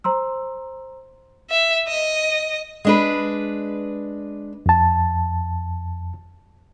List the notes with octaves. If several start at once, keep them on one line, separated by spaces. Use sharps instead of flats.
C5 A#5 C6 E6
E5
D#5
G#3 D4 B4
F2 A5